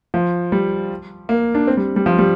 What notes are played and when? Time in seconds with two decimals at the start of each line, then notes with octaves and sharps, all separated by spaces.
0.14 F3
0.52 G3
1.29 A#3
1.55 D4
1.67 C4
1.77 G3
1.96 G3
2.06 F3
2.18 G3